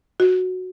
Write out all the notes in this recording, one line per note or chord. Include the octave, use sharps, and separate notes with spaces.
F#4